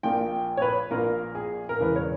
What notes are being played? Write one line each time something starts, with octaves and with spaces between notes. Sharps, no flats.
A#1 A#2 A#3 G5
C#5
B4
A#1 A#2 A#3 A#4
G#4
A#4
E1 E2 C#3 E3 B4
C#5